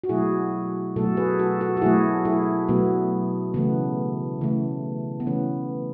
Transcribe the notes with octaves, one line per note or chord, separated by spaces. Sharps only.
F#4
B2 F#3 A3 E4 G#4
B2 F#3 A3 F#4 A4
G#4 B4
F#4 A4
F#4 A4
F#4
B2 F#3 A3 E4 G#4
E4 G#4
B2 F#3 A3 B3
C#3 E3 A3 B3
C#3 E3 A3
B3
C#3 E3 A3 C#4